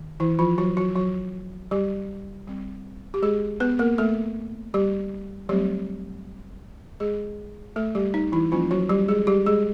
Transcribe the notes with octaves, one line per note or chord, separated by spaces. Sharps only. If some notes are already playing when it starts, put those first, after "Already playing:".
Already playing: D#3
E3 E4
F3 F4
F#3 F#4
F#3 F#4
F#3 F#4
G3 G4
G3 C4
G4
G#3 G#4
B3 B4
A#3 A#4
A3 A4
G3 G4
F#3 G3 A3 C4 G4
G#3 G#4
A3 A4
G3 G4
D#4
E3 E4
E3 F3 G3 A#3 C#4 F4
F#3 F#4
G3 G4
G#3 G#4
G3 G4
G#3 G#4